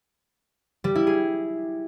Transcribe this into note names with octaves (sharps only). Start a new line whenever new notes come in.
G3
E4
G#4